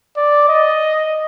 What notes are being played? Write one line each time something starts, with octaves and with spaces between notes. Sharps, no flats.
D5
D#5